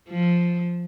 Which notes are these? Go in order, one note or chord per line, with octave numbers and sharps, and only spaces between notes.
F3